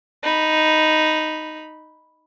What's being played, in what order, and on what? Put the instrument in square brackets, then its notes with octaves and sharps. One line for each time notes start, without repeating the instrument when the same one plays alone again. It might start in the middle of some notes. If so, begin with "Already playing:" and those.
[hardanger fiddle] D#4 B5